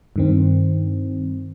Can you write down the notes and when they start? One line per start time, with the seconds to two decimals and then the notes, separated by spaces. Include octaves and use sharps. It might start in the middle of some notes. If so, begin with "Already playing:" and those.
0.16 G2 D#3 C4